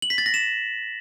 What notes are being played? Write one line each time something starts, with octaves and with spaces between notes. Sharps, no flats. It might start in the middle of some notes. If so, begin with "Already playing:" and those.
F#7
B6
A6
A#6
E7